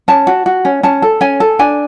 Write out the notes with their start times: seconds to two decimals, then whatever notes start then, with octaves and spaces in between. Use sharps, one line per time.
0.08 C#4 A5
0.27 F#4
0.46 F#4
0.65 C#4
0.83 C#4 A5
1.02 A4
1.21 C#4 G#5
1.40 A4
1.59 D4 G#5